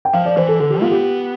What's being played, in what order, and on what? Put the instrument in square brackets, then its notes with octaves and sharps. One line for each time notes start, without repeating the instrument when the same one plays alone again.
[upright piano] G5
[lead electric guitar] F3 [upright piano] F5
[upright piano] D5
[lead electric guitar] E3 [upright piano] C5
[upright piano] A4
[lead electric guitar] D3 [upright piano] A4
[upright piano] G4
[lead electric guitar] B3 [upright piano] F4
[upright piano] G4